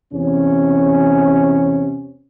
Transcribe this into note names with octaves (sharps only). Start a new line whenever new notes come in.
E2 C3 C#4